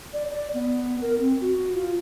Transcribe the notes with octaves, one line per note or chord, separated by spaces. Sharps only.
D5
D5
B3
A#4
C4
F#4
F4